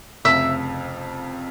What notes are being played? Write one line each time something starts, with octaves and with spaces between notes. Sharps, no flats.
F1 F2 C#3 E5